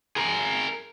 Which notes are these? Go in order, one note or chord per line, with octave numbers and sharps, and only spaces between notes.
G#4 A#4